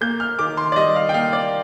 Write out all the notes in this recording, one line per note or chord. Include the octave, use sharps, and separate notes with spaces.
A#3 G6
F6
D#3 D6
C6
D5
G3 D#5
F5
G5
A#3 F5
D5